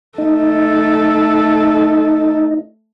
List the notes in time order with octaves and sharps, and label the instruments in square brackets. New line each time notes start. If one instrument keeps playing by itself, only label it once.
[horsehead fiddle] A3 A4 [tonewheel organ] D#4